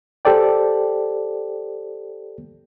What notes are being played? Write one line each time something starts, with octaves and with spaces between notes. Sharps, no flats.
G4 A4 C5 D5 G5